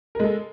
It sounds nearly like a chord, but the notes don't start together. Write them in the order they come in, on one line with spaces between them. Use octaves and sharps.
A#4 G#3 A4